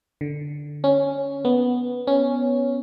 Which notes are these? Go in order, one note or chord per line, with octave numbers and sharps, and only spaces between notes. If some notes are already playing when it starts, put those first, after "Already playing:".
D3
C#4
B3
C#4